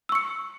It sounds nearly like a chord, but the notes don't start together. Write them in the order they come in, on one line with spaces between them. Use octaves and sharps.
E6 C#6 C#7